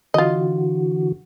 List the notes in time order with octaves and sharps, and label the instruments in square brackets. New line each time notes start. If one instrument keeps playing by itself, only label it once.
[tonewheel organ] D3 E3 F#4 [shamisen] F4 D#5